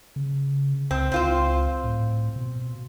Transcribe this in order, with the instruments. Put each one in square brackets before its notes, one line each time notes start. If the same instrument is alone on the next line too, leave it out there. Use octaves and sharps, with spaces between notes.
[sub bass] C#3
[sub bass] C#2 [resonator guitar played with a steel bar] C4
[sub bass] C#2 [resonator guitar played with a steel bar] C4 F4 C5
[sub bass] A2
B2